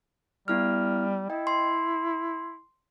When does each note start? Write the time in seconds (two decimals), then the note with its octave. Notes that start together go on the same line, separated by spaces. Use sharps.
0.48 G3 B3 E4 F6
1.30 E4 D#5 G5
1.47 C6